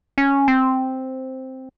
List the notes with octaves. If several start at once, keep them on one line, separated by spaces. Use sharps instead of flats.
C#4
C4